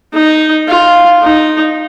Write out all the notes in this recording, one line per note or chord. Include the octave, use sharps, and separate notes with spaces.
D#4
F4
D#4